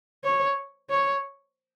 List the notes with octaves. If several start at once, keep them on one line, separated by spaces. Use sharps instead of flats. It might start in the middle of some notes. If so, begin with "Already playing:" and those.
C#5
C#5